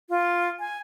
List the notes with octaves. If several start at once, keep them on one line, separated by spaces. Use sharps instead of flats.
F4
G#5